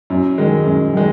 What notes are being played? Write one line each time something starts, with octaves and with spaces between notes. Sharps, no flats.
F#2
D#3 G#3
F#2
D#3 G#3